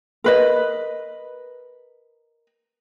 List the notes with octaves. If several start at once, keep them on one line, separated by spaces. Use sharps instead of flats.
A#4 B4 D#5